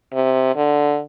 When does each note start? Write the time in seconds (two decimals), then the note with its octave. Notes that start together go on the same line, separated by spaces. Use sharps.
0.13 C3
0.56 D3